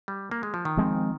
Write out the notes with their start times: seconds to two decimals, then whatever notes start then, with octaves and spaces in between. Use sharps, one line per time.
0.08 G3
0.31 A#3
0.43 G#3
0.54 F3
0.65 D#3
0.77 F3 G#3 C4